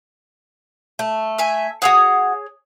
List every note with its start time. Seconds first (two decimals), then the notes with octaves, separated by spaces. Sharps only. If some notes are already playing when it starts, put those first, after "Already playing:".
0.99 A3
1.38 E5 G#5
1.82 F#4 G#4 C#5 F#5 D#6